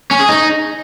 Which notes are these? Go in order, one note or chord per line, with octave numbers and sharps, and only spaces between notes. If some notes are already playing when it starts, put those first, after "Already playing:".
C#4
G#4
D#4